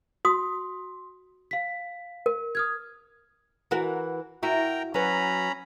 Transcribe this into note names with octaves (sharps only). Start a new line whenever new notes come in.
F#4 C6 D#6
F5 B6
A#4
D#6 F6 G#6
E3 F#4 A#4
E4 F#4 A#4 G5 A#5
F#3 C#4 B4 A#5 B5